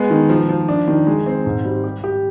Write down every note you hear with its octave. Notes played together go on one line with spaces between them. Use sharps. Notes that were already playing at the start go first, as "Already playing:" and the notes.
Already playing: G#3 B3
D#3
F3
F3
D4
D#3
G#3
C4
G#2
G3
G4
G4